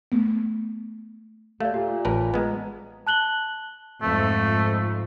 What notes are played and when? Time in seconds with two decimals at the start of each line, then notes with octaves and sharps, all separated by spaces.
0.12 A3 B3
1.60 D#2 A3 D5 F5
1.74 A#2 G4 F5
2.05 A1 A#4 B4 A5
2.34 G#3 B3 B4 A#5
3.07 A5 F#6 F#7 G7
4.02 F2 G#2 A3